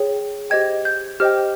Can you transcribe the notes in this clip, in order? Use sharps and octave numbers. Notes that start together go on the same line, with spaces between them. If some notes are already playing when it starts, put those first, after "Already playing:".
Already playing: G#4 C#5 G5
G4 C5 D#5 G5 G#6
G6
G4 C5 D#5 G5 F6